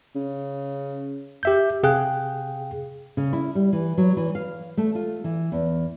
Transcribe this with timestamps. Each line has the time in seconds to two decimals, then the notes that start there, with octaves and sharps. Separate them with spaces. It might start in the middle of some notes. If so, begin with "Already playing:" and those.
0.16 C#3
1.43 G4 E5 G6
1.83 C3 G#4 F5 G5 F#6
3.17 C#3
3.33 E4
3.55 G3
3.73 E3
3.98 F#3
4.17 E3
4.35 F5
4.77 A3
4.95 F4
5.24 E3
5.52 E2